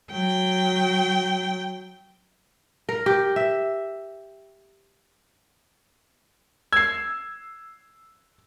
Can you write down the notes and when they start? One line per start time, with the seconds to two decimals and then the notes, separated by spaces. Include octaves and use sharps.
0.11 F#3 G5
2.89 A#4
3.06 G4
3.36 E5
6.73 E6 G#6 C7